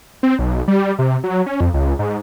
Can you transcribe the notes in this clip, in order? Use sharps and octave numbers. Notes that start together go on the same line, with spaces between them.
C4
B1
G3
C3
F#3
C#4
F2
C#2
G#2